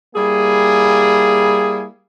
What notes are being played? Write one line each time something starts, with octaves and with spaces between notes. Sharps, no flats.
G3 A#3 E4 G#4